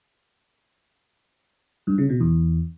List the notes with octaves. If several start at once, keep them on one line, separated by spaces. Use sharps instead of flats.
G2
C#3
B2
E2